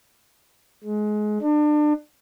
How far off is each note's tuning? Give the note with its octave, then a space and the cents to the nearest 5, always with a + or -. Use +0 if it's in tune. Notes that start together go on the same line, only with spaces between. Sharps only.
G#3 +25
D4 +30